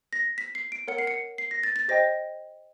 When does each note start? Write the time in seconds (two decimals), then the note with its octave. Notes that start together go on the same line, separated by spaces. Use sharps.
0.13 A#6
0.38 B6
0.55 C7
0.72 D7
0.88 A#4 C#5 F#5 C#7
0.98 C7
1.07 C#7
1.38 C7
1.51 A#6
1.63 A6
1.76 A6
1.88 G4 C5 D#5 G5 A#6